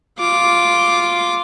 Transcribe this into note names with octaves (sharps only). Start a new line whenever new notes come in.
F4 D6